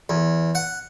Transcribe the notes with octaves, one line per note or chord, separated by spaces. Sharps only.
E2
F#5